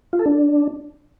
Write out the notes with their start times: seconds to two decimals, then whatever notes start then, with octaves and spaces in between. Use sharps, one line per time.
0.13 F4
0.19 A4
0.26 D4